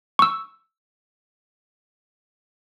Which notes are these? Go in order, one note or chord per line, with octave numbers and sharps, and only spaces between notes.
C#6 E6